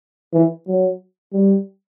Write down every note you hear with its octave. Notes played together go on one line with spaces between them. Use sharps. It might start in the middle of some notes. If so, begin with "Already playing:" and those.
E3
F#3
G3